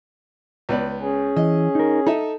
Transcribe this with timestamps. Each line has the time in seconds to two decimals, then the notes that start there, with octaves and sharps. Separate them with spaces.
0.69 C#2 B3 D5
1.01 C#4 G#4
1.36 E3 D#5
1.75 D#4 A#4
2.07 D#4 A4 E5